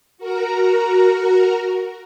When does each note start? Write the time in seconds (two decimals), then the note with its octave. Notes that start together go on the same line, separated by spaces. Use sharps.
0.18 F#4 A#4 A#5